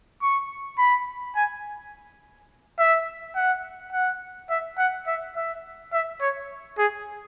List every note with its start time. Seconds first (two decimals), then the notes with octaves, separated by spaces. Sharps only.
0.23 C#6
0.78 B5
1.36 G#5
2.79 E5
3.36 F#5
3.93 F#5
4.50 E5
4.78 F#5
5.07 E5
5.36 E5
5.93 E5
6.21 C#5
6.78 G#4